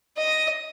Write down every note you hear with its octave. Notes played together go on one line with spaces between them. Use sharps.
D#5